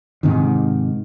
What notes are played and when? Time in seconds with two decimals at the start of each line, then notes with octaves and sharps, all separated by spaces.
0.23 G#2 C3 D#3